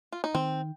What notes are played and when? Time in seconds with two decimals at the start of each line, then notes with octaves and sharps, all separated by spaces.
0.12 F4
0.24 D#4
0.35 D#3 C4